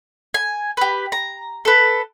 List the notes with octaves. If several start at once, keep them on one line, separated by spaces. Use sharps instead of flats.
G#5
G4 B4
A#5
A4 B4